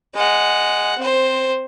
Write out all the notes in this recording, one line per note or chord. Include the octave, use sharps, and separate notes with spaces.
G#3 F#5
C4 C5